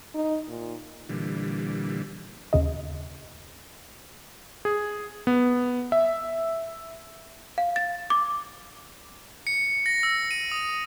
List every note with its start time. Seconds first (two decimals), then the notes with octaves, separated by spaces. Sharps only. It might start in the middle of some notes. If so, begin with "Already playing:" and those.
0.14 D#4
0.48 A#2
1.09 A#2 D3 E3 G3
2.53 D#2 C#3 D#5
4.65 G#4
5.27 B3
5.92 E5
7.58 F5
7.76 A6
8.10 D6
9.47 C#7
9.86 A#6
10.03 E6
10.31 D#7
10.51 D#6